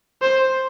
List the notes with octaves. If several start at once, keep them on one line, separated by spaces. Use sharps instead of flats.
C5